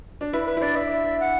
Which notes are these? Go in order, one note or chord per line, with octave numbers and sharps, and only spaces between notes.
D4
E4 B4
B4
E4
D4 D5
E5
F#5